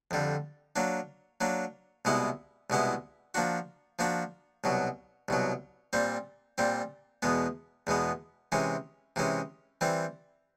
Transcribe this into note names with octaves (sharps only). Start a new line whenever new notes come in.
F2 D3 G3
F#3 A#3 D4
F#3 A#3 D4
C2 B2 G#3 B3 E4
C2 B2 G#3 B3 E4
F3 A#3 D4 F#4
F3 A#3 D4 F#4
C2 B2 F#3
C2 B2 F#3
A#2 G3 C4
A#2 G3 C4
E2 B2 G#3 B3
E2 B2 G#3 B3
C3 E3 G#3 C#4
C3 E3 G#3 C#4
E3 G3 C4